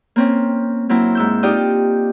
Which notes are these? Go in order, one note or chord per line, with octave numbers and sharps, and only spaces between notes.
A#3 C4 C#4
F#3 A#3 C4 E4
G#2 E6 G6
D#4 F4 G4 D5 G5 D#6